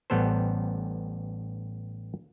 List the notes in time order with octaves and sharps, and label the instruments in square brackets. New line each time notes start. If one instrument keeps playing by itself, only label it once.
[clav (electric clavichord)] A1 G3 B3 A4 C5